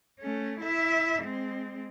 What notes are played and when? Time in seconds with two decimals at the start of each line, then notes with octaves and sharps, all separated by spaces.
0.20 A3 C#4
0.61 E4 E5
1.23 G#3 C4